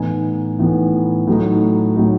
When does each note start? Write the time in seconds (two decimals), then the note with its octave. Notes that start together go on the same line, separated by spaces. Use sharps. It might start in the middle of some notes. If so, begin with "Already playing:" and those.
Already playing: A2 E3 B3 D#4 G#5
0.59 A2 E3 B3 D#4
1.27 A2 F#3 A3 D#4
1.96 A2 F#3 A3 D#4